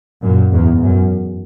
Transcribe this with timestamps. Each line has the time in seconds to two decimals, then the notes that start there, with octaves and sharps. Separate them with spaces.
0.22 F#2 A#2
0.52 E2 G#2
0.82 F#2